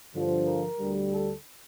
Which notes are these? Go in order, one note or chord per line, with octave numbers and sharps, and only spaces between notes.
G2 D3 F3
A#4
D2 D3 G3
A4